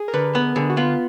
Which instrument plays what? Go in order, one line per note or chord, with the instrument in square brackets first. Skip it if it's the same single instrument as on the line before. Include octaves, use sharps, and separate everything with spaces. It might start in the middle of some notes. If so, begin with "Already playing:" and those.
Already playing: [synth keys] G#4
A#4
[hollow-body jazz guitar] D3 [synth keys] B4
[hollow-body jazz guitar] B3 [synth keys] B4
[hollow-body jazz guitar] D3 [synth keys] G#4
[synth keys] F#4
[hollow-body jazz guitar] B3 [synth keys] F4